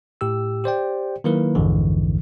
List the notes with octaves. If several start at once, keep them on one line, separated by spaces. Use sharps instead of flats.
A2 G4 E6
G4 C5 D5 G5
D#3 F#3 A#3 E4 A#4 B4
A#1 F2 G#2 D3 E3